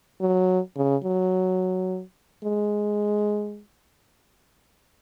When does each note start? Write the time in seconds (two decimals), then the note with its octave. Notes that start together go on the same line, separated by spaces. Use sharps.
0.21 F#3
0.77 C#3
1.04 F#3
2.44 G#3